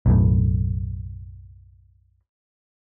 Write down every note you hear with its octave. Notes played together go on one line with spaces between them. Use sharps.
B1 F#2 A2